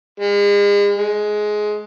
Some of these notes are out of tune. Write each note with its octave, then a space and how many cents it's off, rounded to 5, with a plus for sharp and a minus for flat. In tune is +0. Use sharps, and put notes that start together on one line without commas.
G#3 -40
G#3 +15